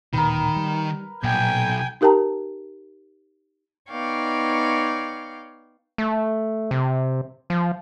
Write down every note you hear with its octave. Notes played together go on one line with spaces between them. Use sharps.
D1 A#2 D#3 A#4 B4
G3
B1 A#2 G5 G#5
D#4 G4 A#4 G5 A5 A#5
B3 D#4 C#5 D5 F5 G5
A3
C3
F3